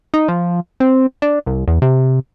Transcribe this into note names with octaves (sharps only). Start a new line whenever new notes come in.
D#4
F3
C4
D4
C2
E2
C3